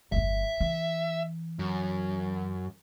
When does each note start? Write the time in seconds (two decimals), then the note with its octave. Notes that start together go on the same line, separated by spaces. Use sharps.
0.12 G1 E2 E5
0.60 E3
1.59 F#2